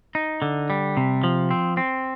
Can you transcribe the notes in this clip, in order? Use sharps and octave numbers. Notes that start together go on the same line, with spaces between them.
D#4
D3
G3
C3
F3
C4
C4